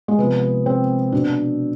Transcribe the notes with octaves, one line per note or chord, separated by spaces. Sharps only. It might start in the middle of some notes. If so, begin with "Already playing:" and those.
G#3
C3 F3 B3
C4
B2 D4